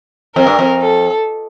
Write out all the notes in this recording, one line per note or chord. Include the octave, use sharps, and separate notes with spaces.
F2 A#4
G2
F2
A4